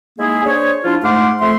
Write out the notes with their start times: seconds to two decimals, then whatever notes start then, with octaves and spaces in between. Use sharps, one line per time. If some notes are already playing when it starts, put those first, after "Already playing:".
0.19 G#3 A#3 D#4 E4 G#4
0.45 D4 G#4 C5 C#5
0.84 F3 D4 E4 F4
1.03 G#2 A3 F#5 C6 D6 F6
1.40 F2 A3 E5 C6